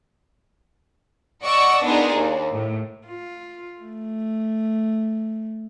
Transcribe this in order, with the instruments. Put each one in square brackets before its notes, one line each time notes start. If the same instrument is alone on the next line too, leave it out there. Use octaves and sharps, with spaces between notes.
[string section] D5 D#5 F#5 C#6 E6
B3 D4 D#4 F4 G#4 A#4
D#2
A2
[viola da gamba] F4
A3